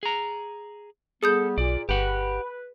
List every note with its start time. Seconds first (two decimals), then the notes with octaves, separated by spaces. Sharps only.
0.03 G#4 A#5
1.23 G3 B3 G#4 A4 D#6 G6
1.58 B1 A#2 D5
1.89 G1 G4 B4 F#5